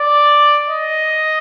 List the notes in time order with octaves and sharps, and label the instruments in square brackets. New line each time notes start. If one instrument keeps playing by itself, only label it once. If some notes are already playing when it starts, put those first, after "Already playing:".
Already playing: [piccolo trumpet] D5
D#5